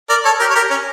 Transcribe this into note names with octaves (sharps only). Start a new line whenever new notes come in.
A#4 D5
A4 C#5
G4 A#4
C#5
G4 A#4
C#4